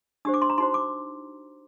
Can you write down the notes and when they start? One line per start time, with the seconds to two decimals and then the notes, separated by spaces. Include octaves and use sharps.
0.25 D4 G4 C5 D#6
0.34 D6
0.42 C6
0.50 A#5
0.58 D#4 F#4 C5 C6
0.74 D6